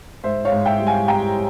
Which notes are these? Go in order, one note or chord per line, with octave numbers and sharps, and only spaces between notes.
G#2 C5 E5
C#5 F5
G#2
E5 G5
G3
F5 G#5
G3 G5 A#5